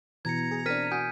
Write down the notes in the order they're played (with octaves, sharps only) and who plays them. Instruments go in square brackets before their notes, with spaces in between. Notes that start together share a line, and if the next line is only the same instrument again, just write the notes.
[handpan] B2 E3 [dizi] A#5 [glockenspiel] G#6 C#7
[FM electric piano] G#4
[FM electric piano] C4 D4 [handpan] A#4 [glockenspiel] F6 B6 D#7
[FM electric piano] F#4 D#6 [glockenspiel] G#5 G6